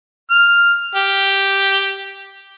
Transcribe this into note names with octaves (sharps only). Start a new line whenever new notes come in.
F6
G4